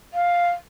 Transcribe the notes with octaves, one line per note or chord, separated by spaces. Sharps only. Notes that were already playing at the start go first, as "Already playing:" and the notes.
F5